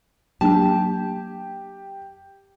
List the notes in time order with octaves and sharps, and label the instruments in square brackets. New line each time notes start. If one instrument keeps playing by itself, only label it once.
[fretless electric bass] F#3 A#3 D4 [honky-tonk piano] G4 [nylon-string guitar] A5